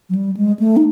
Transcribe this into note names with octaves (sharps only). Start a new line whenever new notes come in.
F#3
G3
G#3
A3
D#4